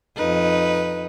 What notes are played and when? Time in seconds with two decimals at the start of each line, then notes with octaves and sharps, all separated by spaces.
0.16 F2 D#4 B4